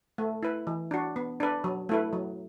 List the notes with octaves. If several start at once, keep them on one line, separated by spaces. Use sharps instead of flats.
A3
E4 B4
E3
D4 F#4
B3
D4 B4
F#3
A3 E4 B4
F#3